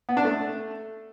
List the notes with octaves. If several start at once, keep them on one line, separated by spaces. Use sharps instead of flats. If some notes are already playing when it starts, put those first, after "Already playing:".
B3
D4
A3